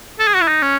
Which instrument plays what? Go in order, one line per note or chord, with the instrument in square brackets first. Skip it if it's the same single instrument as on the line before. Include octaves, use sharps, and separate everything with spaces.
[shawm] A4
G#4
F#4
E4
D#4
C#4